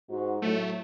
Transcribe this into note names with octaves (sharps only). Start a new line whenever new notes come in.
G#2 F#4
A2 F#3 A3